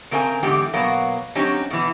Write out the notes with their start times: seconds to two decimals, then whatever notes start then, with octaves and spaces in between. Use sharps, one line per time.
0.11 C#3 C4 A#4 D#5 G#5
0.43 E2 G#2 D3 G4
0.74 B2 F#3 A#3
1.35 F#3 C4 C#4 D#4 G4
1.70 B2 E3